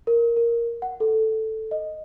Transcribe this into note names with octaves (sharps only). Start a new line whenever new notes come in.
A#4
A#4
F#5
A4
D#5